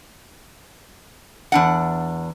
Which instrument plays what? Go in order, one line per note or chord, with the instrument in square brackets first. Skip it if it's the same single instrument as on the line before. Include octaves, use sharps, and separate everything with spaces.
[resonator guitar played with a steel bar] E2 D4 F#5